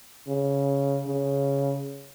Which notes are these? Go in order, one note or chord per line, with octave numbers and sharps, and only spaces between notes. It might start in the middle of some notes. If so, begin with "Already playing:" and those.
C#3
C#3